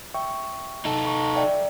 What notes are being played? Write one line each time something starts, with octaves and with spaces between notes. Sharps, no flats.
E5 G5 C#6
D#4 A4
A#5 C#6
D5 E5 G5